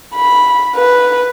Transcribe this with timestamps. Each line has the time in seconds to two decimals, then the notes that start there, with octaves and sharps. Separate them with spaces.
0.15 B5
0.76 B4